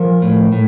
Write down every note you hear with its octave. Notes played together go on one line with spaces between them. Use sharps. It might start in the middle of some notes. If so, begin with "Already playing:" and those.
Already playing: F3 A#4
A2
A2